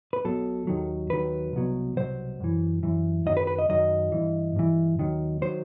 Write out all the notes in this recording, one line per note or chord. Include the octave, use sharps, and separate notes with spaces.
B4
B1 B2 F#3 A4
D#2 D#3 F#3
D#2 D#3 F#3 B4
C2 B2 F#3
C2 B2 F#3 C5
F#2 E3
F#2 E3
F#2 D#3 F#3 D#5
B4
B4
D#5
F#2 D#3 F#3 D#5
G2 E3
G2 E3
D#2 D#3 F#3
D#3 F#3 C5